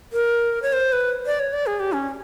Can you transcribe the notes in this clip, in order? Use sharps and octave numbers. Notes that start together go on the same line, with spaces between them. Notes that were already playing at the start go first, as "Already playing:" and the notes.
A#4
C#5
C5
B4
D5
C#5
D5
G#4
G4
C#4